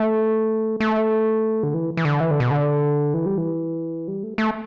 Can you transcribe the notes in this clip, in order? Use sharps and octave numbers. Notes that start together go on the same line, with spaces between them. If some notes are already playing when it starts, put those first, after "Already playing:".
Already playing: A3
A3
D3
E3
E3
D3
E3
D3
B2
D3
E3
G3
E3
G3
A3
A3